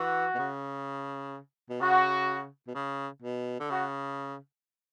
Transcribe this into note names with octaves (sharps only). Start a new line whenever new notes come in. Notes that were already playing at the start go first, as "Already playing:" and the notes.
Already playing: E3 F#4
B2
C#3
B2
C#3 F#4
B2
C#3
B2
D3
C#3 F#4